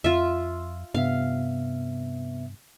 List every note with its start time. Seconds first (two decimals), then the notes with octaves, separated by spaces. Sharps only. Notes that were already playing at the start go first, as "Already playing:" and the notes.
0.04 F2 F4 E5
0.94 G2 C3 B3 E5 F5